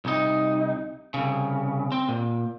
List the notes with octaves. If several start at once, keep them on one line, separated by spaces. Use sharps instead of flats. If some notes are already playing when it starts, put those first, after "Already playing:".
C2 D#4
C2 C#3
C4
A#2